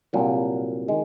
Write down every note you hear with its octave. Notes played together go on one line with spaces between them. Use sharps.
C2 A#2 F#3
D#3 G#3